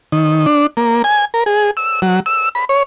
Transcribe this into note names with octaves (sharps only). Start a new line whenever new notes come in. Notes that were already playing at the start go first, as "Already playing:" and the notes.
D#3
D4
A#3
G#5
A#4
G#4
E6
F#3
E6
B5
C#5